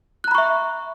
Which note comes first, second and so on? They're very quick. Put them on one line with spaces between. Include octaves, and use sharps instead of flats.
F#6 A#5 B5 C#6 E5